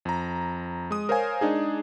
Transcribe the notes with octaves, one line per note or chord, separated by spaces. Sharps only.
F2 A#5
G#3 D#6
A#4 C5 C#5 F5 G#5
G#3 D4 D#4 G#4